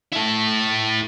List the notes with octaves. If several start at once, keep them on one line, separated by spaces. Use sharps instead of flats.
E4 A4